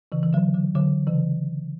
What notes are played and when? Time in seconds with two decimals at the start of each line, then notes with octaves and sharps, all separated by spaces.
0.12 C#3 E3
0.23 E3
0.33 D3 F#3
0.54 D3 F#3
0.75 D3 F#3
1.07 C#3 E3